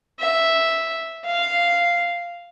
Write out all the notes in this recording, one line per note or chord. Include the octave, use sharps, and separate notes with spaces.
E5
F5